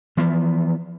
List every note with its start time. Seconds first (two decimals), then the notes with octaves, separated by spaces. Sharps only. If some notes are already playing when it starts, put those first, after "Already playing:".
0.17 E3 F3 B3